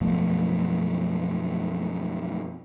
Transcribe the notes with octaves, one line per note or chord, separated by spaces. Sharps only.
F#2 B2 F3 A3